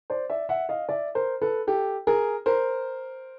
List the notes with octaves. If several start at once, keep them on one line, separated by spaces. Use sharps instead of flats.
C5 D5
D5 E5
E5 F#5
D#5 F5
D5 E5
A#4 C5
A4 B4
G4 A4
G#4 A#4
A#4 C5